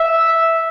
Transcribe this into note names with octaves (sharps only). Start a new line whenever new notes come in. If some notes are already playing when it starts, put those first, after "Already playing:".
Already playing: E5